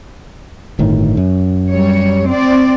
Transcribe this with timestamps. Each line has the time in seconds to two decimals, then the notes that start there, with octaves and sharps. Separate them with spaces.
0.79 G1 A2 D#3
1.17 F#2
1.70 G3 C#5
2.29 C4 D5